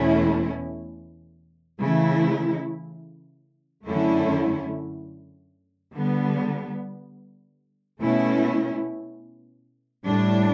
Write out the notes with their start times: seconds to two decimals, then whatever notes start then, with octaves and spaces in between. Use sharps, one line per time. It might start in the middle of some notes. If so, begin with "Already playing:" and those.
Already playing: E2 B2 A3 C#4 E4
1.80 C#3 E3 A3 E4
3.86 F#2 D3 A3 C#4 E4
5.93 D3 G3 B3
7.99 B2 A3 C#4 E4
10.05 A2 G3 D4